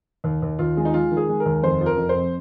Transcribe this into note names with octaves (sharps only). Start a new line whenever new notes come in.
D#2
D#2
D#2 F4
G#3
D#4
G#3 F4
D#3
G#4
G#3
A#4
D#2
F1 C5
F3
A#4
F1
C5
F2